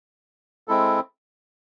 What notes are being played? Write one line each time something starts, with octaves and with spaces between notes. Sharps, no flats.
G#3 C4 E4 A4